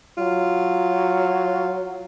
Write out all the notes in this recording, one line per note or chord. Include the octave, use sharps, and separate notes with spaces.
F#3 F4